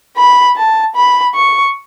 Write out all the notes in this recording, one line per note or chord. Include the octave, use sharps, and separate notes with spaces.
B5
A5
B5
C#6